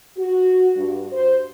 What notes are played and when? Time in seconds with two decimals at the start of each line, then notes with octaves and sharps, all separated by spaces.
0.17 F#4
0.76 G2
1.12 C5